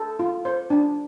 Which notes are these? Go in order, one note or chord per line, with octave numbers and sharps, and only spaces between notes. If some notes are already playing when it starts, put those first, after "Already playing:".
Already playing: A4
F4
C5
D4